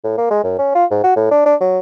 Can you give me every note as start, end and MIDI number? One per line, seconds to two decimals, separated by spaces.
0.04 0.15 45
0.18 0.29 58
0.31 0.41 56
0.44 0.54 42
0.59 0.75 61
0.75 0.85 65
0.91 1.00 44
1.04 1.14 66
1.16 1.30 45
1.31 1.42 62
1.46 1.55 62
1.61 1.79 54